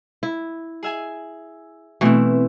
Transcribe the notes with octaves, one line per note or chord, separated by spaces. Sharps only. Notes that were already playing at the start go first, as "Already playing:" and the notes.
E4
G#4 E5 G#5
B2 E3 A3 C4 E4 B4